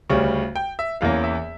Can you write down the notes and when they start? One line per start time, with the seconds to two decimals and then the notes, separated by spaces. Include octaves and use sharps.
0.10 D2 C#3 G3 C#4 C#6
0.56 G5
0.79 E5
1.01 E2 E3 A#3 C#4 F5
1.24 E5